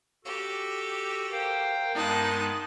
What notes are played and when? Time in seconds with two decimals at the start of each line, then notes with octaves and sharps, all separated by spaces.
0.25 F#4 G4 A4
1.31 A#4 C5 F5 G5
1.94 G2 G#3 B3 D#4 A5 F#6